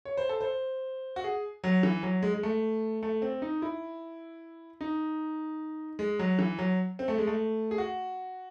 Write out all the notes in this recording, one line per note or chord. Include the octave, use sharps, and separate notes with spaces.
C#5
C5
A4
C5
F#4
G#4
F#3
E3
F#3
G#3
G#3
A3
A3
C4
D#4
E4
D#4
G#3
F#3
E3
F#3
C4
A3
G#3
A3
G#4
F#4